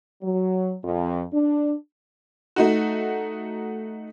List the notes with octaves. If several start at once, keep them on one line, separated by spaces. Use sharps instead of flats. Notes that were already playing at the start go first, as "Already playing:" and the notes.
F#3
F2
D4
A3 D#4 F#4